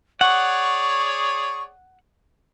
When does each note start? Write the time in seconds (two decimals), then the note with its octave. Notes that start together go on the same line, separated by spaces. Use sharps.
0.21 G#4 C#5 D5 F#5 C#6